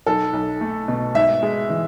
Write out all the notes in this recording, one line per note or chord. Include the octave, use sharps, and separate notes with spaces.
B1 A4
B1
A3
B2
G#1 E5
G#3
E3